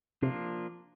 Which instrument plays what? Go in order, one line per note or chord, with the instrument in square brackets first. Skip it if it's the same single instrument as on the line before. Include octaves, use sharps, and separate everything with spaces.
[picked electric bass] C3 [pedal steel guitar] F3 A#3 D4 F4